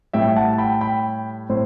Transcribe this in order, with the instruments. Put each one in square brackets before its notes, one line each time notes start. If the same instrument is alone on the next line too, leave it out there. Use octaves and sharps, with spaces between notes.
[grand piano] A2 G3 E5 G5
F#5 A5
A5
G5 B5
G5 B5
A2 C5